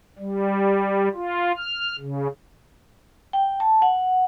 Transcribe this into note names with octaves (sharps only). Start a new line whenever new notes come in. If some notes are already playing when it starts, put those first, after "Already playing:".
G3
F4
F6
C#3
G5
A5
F#5